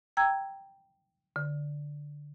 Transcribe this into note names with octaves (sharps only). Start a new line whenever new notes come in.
G5 A#5 E6 G#6
D3